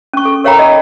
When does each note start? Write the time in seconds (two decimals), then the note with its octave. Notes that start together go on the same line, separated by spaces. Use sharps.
0.13 C#4 C#6
0.25 A4
0.44 A#4 C#5 F5 G5 A#5 B5
0.59 D#5